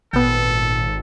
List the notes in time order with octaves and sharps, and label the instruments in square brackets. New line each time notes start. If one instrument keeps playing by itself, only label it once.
[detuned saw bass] G#1 [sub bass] A#2 [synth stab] B3 G5 [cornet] A4